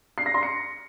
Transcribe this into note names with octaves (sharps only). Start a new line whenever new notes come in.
C7
A#6
C6
C#7